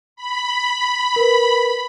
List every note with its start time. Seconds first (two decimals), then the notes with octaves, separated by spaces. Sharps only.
0.16 B5
1.16 A#4 B4